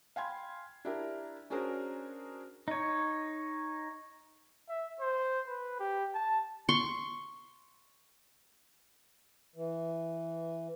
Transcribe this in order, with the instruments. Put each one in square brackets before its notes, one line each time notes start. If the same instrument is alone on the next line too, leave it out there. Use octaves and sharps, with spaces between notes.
[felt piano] F5 G5 G#5 B5 C6 G#6
D4 E4 G4 A#4
C#4 D4 F#4 G#4 A#4 C5
[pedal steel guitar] D#4 C#5
[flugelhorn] E5
C5
B4
G4
A5
[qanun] C6 C#6
[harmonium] E3